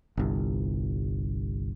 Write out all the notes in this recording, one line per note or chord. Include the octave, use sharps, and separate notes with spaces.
G1 C2